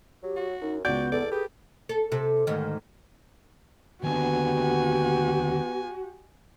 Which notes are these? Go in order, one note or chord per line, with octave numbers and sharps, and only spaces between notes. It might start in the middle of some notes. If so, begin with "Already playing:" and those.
F#3 G4
F#4
F#2 D#4
C#2 B3 F#4 D5 G6
E2 A4 D5
G4 G#4 B4
A4
C3 A4
D2 G#2 D#3
D#2 D3 B3 F#4 G4 G#5